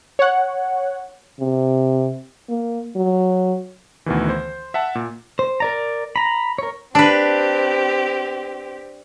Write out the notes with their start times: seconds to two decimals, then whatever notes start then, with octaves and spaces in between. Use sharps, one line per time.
0.19 C#5 F#5
1.40 C3
2.49 A#3
2.96 F#3
4.06 D2 B2 D#3 E3
4.29 C5
4.74 E5 F#5 A5
4.95 A#2
5.39 C5
5.60 A#4 D5 A#5
6.16 A#5 B5
6.58 A#4 C#5
6.95 C4 D4 G4 B4